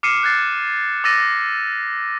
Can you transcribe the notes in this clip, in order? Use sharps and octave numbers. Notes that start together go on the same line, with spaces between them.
D6 F6 C7 C#7 D#7 E7
F#6 G#6 A6 C7
D6 E6 A6 A#6 D#7